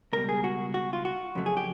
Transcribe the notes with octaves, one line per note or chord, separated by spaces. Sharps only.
C#2 B2 G3 A#4
G#4
F#4
F#4
F4
F#4
F2 C#3 F#3 A3
G#4
G4